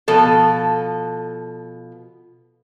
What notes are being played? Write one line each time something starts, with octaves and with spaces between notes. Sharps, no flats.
B2 F3 A4